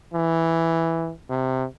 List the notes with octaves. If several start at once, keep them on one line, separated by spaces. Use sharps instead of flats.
E3
C3